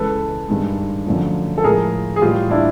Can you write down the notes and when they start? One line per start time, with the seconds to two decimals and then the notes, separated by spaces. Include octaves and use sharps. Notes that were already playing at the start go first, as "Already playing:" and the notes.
Already playing: C#2 C#3 E3 G#3 A4 B4
0.48 G2 D#3 G#3
1.06 F#2 D3 F3 A3
1.58 A4
1.64 A2 F3 G#3 G#4 A#4
2.16 G#4
2.22 A2 E3 G3 A#3 F4 G4
2.51 D4 E4